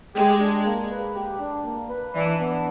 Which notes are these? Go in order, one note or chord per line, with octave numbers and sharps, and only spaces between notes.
G#3 G4
D4
A#3
B4
G4
D4
A#3
B4
E3 D4
B3